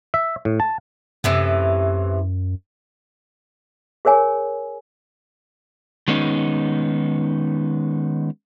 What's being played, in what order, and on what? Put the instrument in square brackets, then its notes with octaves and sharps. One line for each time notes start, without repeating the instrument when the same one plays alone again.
[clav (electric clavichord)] E5
A2
A5
[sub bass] F#2 [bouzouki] A2 C3 E3
[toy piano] G#4 A#4 C#5 G#5
[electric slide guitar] D#3 G#3 B3 C#4 D#4